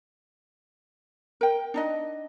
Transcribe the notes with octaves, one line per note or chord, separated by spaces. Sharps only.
A#4 G5
D4 D#4 D#5